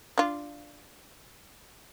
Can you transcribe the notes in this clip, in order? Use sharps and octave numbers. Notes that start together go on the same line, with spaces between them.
D4 F4